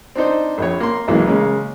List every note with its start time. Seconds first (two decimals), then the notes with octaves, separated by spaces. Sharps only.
0.15 C4 D4 D#4 C5
0.58 A#1 F2 C#5
0.80 A#3 C6
1.08 B1 E3 F#3 G#3 A#3 C#4
1.26 C#3 G#3 A#3 C#4